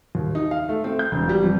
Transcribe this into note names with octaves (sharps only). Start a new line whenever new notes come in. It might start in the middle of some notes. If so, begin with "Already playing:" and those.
D#2
D#4
F5
A3
C4
G6
E1
G3
F2